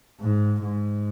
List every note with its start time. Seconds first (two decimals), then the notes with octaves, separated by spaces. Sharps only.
0.20 G#2
0.63 G#2